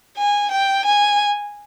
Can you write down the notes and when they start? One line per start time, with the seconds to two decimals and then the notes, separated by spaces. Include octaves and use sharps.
0.18 G#5
0.51 G5
0.86 G#5